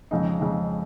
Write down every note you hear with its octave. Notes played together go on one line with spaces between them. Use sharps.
F2 C#3 G#3 D#4
F2 C#3 G#3 D#4